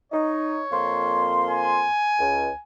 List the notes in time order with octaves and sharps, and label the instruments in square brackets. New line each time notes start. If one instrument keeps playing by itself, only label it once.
[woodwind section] D#4 [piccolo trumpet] C#5
[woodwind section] F2 A#3 C6
[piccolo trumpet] G#5
[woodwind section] C#2